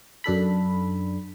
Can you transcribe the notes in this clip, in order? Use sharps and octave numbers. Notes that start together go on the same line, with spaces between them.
F#2 D4 A4 B5